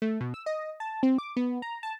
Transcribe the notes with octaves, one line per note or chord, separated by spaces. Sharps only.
A3
B2
E6
D#5
A5
C4
D6
B3
A#5
A5